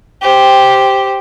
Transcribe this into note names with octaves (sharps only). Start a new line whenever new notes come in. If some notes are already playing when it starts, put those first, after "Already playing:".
G4 C5